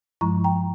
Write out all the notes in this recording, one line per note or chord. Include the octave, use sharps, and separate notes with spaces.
G2 F3 G#3 E4 A#5 C#6
G5 A#5